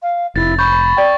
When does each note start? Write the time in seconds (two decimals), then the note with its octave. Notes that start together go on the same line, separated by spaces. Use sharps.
0.03 F5
0.36 F1 E4 A6
0.59 B5 C#6 G6
0.97 D5 G5